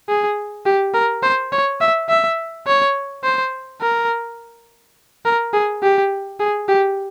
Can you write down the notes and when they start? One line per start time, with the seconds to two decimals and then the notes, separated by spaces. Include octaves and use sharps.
0.09 G#4
0.66 G4
0.94 A#4
1.23 C5
1.52 C#5
1.81 E5
2.09 E5
2.67 C#5
3.24 C5
3.82 A#4
5.25 A#4
5.53 G#4
5.83 G4
6.40 G#4
6.69 G4